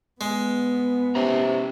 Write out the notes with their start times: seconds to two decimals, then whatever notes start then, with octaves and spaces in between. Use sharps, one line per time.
0.21 G#3 B3
1.15 C3 C#4 A5 A#5